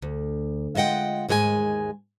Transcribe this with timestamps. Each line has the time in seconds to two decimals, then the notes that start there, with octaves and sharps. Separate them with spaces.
0.02 D2
0.75 G#3 F4 D#5 F#5 G5
1.29 D#2 G#2 G#3 A4 G#5